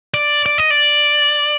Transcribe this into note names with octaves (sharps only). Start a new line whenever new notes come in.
D5
D5
D#5
D5